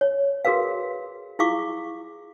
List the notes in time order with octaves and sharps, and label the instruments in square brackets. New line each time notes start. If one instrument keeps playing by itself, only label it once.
[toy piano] C#5
F#4 G#4 A#4 B4 F5
E4 F4 G#4 F5 C#6 D6